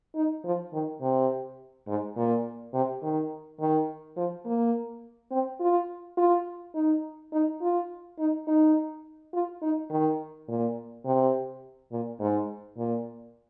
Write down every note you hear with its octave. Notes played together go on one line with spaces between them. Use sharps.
D#4
F3
D#3
C3
G#2
A#2
C3
D#3
D#3
F3
A#3
C4
F4
F4
D#4
D#4
F4
D#4
D#4
F4
D#4
D#3
A#2
C3
A#2
G#2
A#2